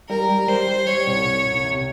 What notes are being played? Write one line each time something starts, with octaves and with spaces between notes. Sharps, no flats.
G3 A#4
G3
G3 C5
G3
G3 C#5
C2
C2
C2
C3